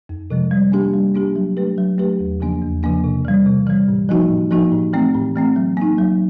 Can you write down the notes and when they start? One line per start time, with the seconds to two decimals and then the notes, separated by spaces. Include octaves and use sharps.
0.09 F2
0.30 C3 F3 G#3
0.51 G3
0.72 A#3 D4 G4
0.94 G3
1.15 A#3 D4 G4
1.36 F#3
1.57 A3 D4 G4 B4
1.78 F#3
1.98 A3 D4 G4 B4
2.19 E2
2.40 C#3 F3 A#3 D4
2.62 E2
2.83 C#3 F3 A#3 D4
3.04 C3
3.25 E3 G3
3.46 C3
3.67 E3 G3
3.88 A2
4.09 F3 A#3 D#4 F#4
4.30 A2
4.51 F3 A#3 D#4 F#4
4.72 A2
4.93 E3 A3 C4
5.14 A2
5.36 E3 A3 C4
5.56 F#3
5.77 A#3 D#4
5.98 F#3